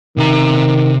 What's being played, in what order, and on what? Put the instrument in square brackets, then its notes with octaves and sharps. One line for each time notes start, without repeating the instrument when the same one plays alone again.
[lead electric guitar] C3 A#5 [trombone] D#3